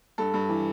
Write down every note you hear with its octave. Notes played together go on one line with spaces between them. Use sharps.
G2 A4
G2
E3